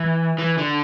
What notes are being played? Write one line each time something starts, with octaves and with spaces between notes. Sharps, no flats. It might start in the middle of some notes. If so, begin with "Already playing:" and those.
Already playing: E3
E3
D3